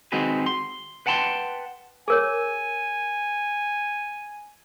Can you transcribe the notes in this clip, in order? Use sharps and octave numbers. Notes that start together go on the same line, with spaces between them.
D#3 G#3 C4 F#4 G#4 B4
C6
B4 F#5 G5 A5 B5 C6
G#4 A#4 C#5 G#5